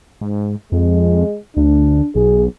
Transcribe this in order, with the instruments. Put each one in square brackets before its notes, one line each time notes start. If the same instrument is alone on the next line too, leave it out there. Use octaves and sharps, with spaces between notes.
[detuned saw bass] G#2
[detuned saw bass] F2 [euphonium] G#3
[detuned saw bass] D2 [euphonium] D4
[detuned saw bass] B1 [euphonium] G#4